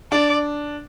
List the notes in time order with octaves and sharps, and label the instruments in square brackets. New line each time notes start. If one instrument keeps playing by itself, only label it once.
[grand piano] D4 [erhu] D5